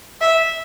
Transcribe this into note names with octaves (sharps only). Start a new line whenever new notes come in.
E5